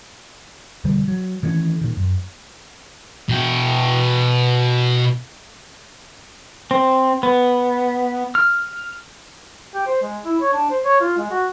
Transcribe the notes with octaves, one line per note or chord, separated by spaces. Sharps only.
E1 D3 G3
F#3
D#3 E3 A3 C#4
A#2 D#3
F#2
B2 G5
C4
B3
F6
G4
C5
G#3
E4
C#5
D4
C5
C#5
F4
G#3
F#4